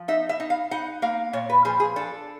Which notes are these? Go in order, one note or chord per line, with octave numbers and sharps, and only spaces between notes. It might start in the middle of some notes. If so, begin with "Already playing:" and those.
Already playing: F3
D#4 E5
E5
D#4
F5
D#4 F#5
A#3 F5
A#2 C#5
B4
F3 G#4
G#4
D4 A4